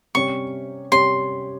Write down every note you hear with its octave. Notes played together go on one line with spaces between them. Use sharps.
C3 G3 C#4 G4 C#5 C#6
C3 G3 C#4 G4 C#5 C6